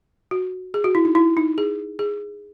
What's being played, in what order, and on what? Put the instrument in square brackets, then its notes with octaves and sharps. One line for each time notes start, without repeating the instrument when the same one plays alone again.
[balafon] F#4
G#4
F#4
E4
D#4
E4
D#4
G#4
G#4